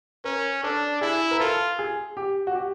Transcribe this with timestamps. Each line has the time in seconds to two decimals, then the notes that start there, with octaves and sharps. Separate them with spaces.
0.24 C#4 A#4
0.63 D4 A4
1.01 E4 G#4
1.31 A#4
1.40 F4 A4
1.79 G#4
2.17 G4
2.47 F#4
2.55 G4